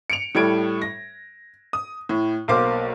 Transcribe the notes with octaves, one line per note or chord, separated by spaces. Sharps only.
C#7 D7 F7
A2 G3 A4 G#6 D7
A#6
D#6
A2
B1 A#3 C5 F5 D6